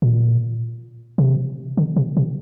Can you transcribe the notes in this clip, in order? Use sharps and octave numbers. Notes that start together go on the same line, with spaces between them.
A#2
C3
D3
C3
C3